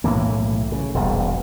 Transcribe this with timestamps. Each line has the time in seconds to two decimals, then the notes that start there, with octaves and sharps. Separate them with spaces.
0.04 B1 A2 E3 A#3
0.72 C#3
0.94 E1 A#1 G3